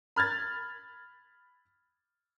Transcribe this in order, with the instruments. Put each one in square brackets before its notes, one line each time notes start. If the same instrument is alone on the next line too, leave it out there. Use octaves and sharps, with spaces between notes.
[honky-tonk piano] B5 F6 G#6 A6